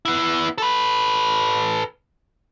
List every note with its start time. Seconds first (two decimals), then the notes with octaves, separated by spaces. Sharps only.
0.05 B3 E4
0.58 A4 B4